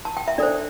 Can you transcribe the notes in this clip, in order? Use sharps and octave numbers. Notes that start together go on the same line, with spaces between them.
A5
G5
E5
D4 A4 C5 D5